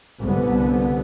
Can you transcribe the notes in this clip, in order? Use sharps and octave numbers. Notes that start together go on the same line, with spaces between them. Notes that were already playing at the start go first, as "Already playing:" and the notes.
C2 D3 B3